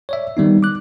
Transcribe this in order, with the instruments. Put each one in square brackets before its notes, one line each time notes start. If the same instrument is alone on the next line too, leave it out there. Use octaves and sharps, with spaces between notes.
[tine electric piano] C#5 D5 E5
D#3 G3 B3 D#4
D6 F#6